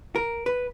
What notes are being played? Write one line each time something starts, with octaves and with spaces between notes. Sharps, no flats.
A#4
B4